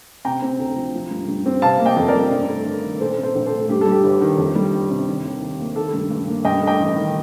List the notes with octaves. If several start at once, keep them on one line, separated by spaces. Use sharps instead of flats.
C3 G5 A#5
C4
D2
F3
F3
G2
G2
C4
C3 F5 A5
A#3
D#5 G5
F2
A#4 D5
G3
G2
A3
G1
D#3
A#2 A4 C5
C4
A4 C5
A#1
A4 C5
A3
G2 G4
G3 A4
G4
G1
D#3
F2
G3
G1
C3
D#3
D#2
D#2
A#3
D#3 A4
G2
G2
A#3
G2 D#5 G5
A3
D#5 G5
A1
D#3